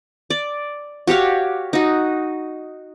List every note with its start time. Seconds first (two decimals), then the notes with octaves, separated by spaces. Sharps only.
0.30 D5
1.07 F#4 G4 C#5 F5
1.73 D#4 F#4